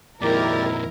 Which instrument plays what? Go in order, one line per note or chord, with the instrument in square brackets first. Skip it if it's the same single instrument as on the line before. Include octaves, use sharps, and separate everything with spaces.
[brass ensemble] G#1 D#3 E4 [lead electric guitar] F2 A#2 [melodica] G4 D5 [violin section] A#4